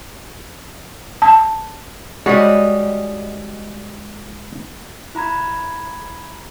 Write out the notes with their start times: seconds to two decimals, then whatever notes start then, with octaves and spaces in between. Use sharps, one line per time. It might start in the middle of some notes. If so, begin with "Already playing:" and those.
1.22 A5
2.26 G3 G#3 F#4 C#5 D#5
5.15 E4 A#5 B5 G#6